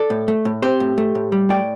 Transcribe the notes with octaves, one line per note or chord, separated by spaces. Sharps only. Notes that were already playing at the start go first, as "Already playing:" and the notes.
Already playing: A4 D5
A2
A3
A2
C4 G4 C5
A2
A3
A2
G3
A2 D5 G5